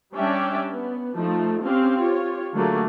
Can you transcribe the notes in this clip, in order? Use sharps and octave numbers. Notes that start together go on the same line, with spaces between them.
G3 C#4 D4 D5 E5 G5
B3
F3 A3 D#4
C4 C#4 G4 F5
F4 G4 C#5
D3 F#3 A3 A#3 G#4